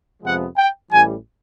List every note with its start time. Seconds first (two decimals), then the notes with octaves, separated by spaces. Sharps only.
0.23 F2 C3 F3 G#3 B3 F#5
0.58 G5
0.91 A1 A2 E3 G3 G#5